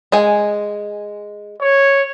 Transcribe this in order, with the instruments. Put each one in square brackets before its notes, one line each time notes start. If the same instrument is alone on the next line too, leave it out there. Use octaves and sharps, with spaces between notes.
[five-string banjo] G#3 G#5
[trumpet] C#5